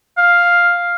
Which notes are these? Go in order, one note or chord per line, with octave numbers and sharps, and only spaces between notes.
F5